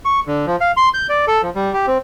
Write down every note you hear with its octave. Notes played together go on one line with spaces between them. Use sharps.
C#6
D3
F3
F5
C6
G6
D5
A4
F3
G3
G4
C4